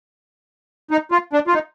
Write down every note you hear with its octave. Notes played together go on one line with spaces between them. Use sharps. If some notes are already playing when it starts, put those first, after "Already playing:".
D#4
F4
D4
F4
D#4